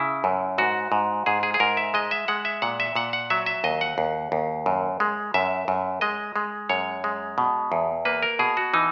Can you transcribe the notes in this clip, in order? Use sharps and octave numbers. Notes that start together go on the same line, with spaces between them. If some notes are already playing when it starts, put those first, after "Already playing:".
Already playing: C#3 E4
F#2
G#2 F#4
G#2
G#2 G#4
G#4
G#4
G#2 A#4
E5
G#3 D#5
E5
G#3 F#5
E5
A#2 F#5
E5
A#2 F#5
F#5
F#3 E5
E5
D#2 D#5
F#5
D#2
D#2
F#2
G#3
F#2 E5
F#2
G#3 D#5
G#3
F#2 C#5
G#3
B2
E2
A#3 B4
A#4
B2 G#4
F#4
E3 D#4